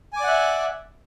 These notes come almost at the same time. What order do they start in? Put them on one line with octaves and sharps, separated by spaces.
G#5 D6 D5 F#5 E5